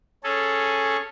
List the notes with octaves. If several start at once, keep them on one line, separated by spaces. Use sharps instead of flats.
C#4 G#4 A4